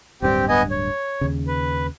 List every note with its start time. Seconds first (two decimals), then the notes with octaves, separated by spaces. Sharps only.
0.22 D1 G2 C4 D4 G4
0.48 B3 D#5 G#5
0.71 C#5
1.21 D#2 C#3
1.47 B4